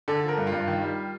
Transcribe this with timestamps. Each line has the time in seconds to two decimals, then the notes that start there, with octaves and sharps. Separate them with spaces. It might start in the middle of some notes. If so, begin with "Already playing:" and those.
0.08 D3 A4
0.24 F3 A#4
0.37 G2
0.47 F4
0.52 G2
0.67 D#3
0.81 G3